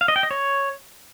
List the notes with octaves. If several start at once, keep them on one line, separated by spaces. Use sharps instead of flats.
F5
D#5
G5
D#5
C#5